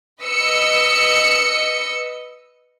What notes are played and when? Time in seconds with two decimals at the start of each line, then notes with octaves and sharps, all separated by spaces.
0.22 B4 D#5 E6 C#7